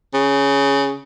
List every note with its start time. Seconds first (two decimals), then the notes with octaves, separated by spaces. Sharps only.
0.14 C#3